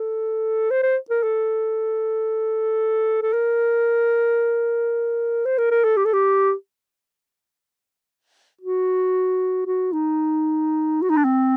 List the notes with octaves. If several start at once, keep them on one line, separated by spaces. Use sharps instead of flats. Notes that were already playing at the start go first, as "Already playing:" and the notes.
Already playing: A4
C5
C5
A#4
A4
A4
A#4
C5
A#4
A#4
A4
G4
A4
G4
F#4
F#4
D#4
F#4
D#4
D4
C4